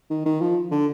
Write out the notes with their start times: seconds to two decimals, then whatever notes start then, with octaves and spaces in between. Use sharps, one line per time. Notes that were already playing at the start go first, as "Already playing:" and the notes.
0.10 D#3
0.26 D#3
0.41 F3
0.71 D3